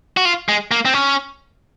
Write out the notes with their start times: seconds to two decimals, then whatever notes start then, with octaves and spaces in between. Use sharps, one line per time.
0.17 F#4
0.25 F4
0.49 G#3
0.71 A#3
0.85 C4
0.94 C#4